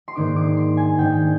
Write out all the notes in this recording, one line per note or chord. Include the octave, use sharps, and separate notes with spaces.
C6
G#2 D#3 A#3 D4 D6
D6
C6
G#5
G#2 D#3 A#3 D4 G5